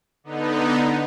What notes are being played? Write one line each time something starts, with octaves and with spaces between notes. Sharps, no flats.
D3 B3 D#4